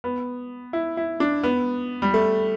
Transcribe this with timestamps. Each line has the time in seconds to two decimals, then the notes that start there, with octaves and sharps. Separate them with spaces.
0.04 B3
0.73 E4
0.97 E4
1.20 D4
1.43 B3
2.02 G3
2.14 A3